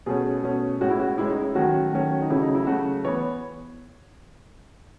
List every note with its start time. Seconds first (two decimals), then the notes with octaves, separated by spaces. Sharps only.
0.06 B2 A3 C#4 G#4
0.43 B2 A3 C#4
0.81 A2 G#3 C#4 F#4
0.90 E4
0.99 F#4
1.18 A2 G#3 C#4 E4
1.31 D#4
1.42 E4
1.55 D#3 F#3 A3 C#4 F#4
1.93 D#3 F#3 A3 C#4
2.21 D#4
2.30 C#3 F#3 A3 E4
2.42 D#4
2.55 E4
2.67 C#3 F#3 A3 F#4
3.05 E3 B3 C#5